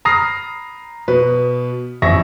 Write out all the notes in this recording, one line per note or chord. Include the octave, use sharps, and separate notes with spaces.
A#5 B5 D#6 F6 A#6 C7
B2 B4
A1 F2 E5 C#6 A#6